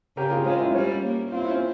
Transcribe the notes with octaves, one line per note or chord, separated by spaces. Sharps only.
C#3 G4 A#4
F4 G#4
G#3 C#4 F4
E4
G3 C#4
A#3
C4 F4
E4
C#4